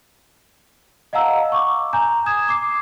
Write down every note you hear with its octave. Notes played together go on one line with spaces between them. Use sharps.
D#5 F5 F#5 A5 A#5 E6
C#6 D6
G#5 A#5 G6
D#6 G#6 E7
D6 C7